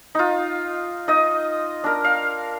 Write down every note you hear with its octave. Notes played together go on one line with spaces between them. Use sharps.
D#4 F4
D#4 D#5
D4 A#4
F5